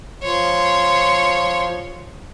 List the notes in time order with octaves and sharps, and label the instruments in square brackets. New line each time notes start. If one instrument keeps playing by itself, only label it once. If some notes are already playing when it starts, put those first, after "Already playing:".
[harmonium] F3 [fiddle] C#5 C6